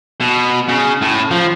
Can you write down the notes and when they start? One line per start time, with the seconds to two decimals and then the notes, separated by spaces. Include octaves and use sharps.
0.20 B2
0.69 C#3
1.02 A2
1.31 F3